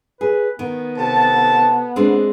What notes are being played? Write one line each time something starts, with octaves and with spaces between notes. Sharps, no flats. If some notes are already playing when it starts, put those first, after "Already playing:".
G#4 B4
D#3 B3
C3 A4 A5
G#3 C4 D4